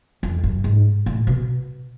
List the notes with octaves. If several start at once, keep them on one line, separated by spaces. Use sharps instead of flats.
F2
F#2
G#2
A2
B2